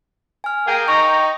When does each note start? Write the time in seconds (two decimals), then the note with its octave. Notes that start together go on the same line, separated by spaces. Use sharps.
0.44 G#5 F6
0.67 A#3 G#4 G5
0.88 D#4 A#5 C#6